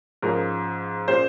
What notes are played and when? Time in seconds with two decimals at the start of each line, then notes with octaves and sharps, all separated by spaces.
0.22 G#2 F3 G#3 C#4 A#4
1.08 A#2 G#3 C#4 C5